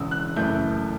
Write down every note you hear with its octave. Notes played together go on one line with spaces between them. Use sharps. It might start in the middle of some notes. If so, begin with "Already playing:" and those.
Already playing: E1 E2 C#3 E6
F#6
F#1 F#2 E3 A3 G6